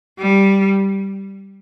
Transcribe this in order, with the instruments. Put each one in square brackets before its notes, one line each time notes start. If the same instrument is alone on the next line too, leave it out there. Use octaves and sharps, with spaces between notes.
[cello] G3